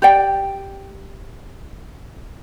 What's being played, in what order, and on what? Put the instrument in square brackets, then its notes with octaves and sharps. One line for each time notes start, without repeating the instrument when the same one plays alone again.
[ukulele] G4 D5 G5